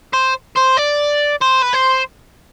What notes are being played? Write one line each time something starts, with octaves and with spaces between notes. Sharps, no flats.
C5
C5
D5
C5
B4
C5